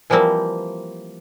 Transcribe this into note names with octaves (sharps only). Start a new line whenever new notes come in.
E3 F3 G3 A#3 C4